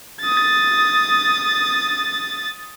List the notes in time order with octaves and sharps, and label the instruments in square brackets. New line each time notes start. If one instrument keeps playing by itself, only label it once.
[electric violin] D#6 A6